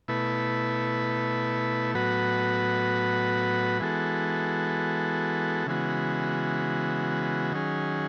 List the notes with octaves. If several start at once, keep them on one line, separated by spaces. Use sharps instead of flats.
B2 A3 E4 B4
A2 F#3 B3 F#4 B4
E3 G#3 B3 F#4 A4
C#3 E3 G#3 B3 F#4
D#3 F#3 C#4 G#4